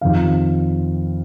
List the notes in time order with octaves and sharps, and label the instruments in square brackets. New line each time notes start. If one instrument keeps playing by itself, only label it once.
[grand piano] F2 C3 D#3 F5